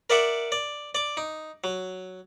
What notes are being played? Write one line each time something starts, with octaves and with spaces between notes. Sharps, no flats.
A#4 D5 E5 F#5 D6
D5
D5 D6
D#4
F#3